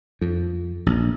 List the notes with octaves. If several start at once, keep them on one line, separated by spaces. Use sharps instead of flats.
F2
A#1